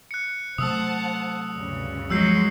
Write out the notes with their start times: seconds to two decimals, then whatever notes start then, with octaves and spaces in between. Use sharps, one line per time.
0.11 F#6 C#7
0.58 C3 F#3 A3 C5 F#5 A5 D#6 E6
1.53 D2 G2 C#3
2.10 F3 F#3 G#3 E6 G6 C7